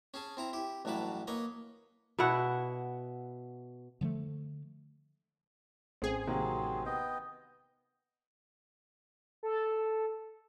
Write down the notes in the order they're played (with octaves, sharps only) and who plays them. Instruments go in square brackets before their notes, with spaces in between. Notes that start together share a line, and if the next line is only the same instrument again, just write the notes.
[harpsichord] C#4 G#4 A5
C4 E4 A#5
E4 G4
A1 G2 F#3 E4 A5 B5
A#3 B4 C#5 D#5
[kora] B2 E4 F#5
[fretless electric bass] D3 F3 G3 A3
[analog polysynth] A1 G#4 [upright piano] C4
[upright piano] C3 D#3 A#3 [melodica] F#3 C4
[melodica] B3 D#5 G5
[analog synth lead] A4